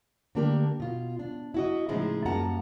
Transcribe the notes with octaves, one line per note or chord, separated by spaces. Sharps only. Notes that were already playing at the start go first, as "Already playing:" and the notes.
D3 A3 A#3 D4 G4 A#4
B2 F4
D4
E4 F#4 D#5
A2 C#3 F3 G#3 D#4 E4
F#2 G3 A#3 F#5 A5 A#5